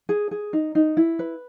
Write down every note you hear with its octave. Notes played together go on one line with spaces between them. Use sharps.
G#4
G#4
D#4
D#4
E4
B4